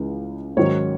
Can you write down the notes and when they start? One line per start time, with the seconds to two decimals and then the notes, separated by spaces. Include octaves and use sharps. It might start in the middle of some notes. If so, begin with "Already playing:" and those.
Already playing: C#2 C#3 E3 G#3
0.57 G#2 D#3 F#3 C#4 C#5